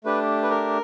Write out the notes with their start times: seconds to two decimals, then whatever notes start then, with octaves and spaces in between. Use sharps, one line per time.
0.04 A3 D4 G4 B4
0.43 B4
0.50 A#4